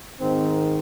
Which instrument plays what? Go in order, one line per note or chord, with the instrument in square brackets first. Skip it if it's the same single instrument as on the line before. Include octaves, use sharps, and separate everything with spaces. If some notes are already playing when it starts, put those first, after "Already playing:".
[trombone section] G#2 D#3 C4